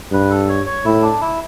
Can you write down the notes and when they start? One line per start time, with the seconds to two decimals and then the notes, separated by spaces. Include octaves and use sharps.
0.12 G2 B4
0.30 A4
0.49 C#5
0.66 C#5
0.85 A2 E4
1.02 D4
1.21 E4